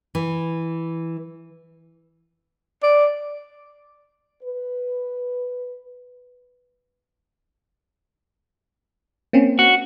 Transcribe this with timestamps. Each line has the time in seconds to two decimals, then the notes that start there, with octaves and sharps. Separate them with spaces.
0.15 E3
2.83 D5
4.43 B4
9.33 A#3 C4 C#4
9.59 F#4